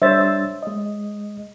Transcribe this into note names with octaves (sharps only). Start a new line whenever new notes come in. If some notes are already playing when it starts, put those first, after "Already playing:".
G3 D4 C5 C#5 E5 A6
E6
G#3 D#5